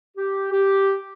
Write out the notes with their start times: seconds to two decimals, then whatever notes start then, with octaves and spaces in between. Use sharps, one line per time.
0.16 G4
0.51 G4